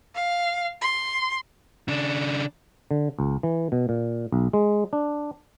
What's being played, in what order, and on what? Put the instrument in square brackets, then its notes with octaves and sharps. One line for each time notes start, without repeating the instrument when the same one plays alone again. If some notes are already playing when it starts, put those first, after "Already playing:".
[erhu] F5
C6
[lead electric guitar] C#3 D4
[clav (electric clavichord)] D3
C#2
E3
B2
A#2
B1
G#3
D4